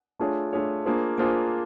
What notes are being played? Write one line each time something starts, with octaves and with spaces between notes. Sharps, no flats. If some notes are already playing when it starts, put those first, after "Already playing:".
A3 D4 F4 G#4 C#5
A3 D4 F4 G#4 C#5
A#3 D4 F4 G#4 C5
A#3 D4 F4 G#4 C5